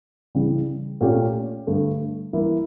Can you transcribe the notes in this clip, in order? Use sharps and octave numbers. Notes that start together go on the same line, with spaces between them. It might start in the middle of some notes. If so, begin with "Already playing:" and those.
C#3 E3 G3
A#2 A3 C#4 G4
G2 D3 A3
E3 G3 A#3 E4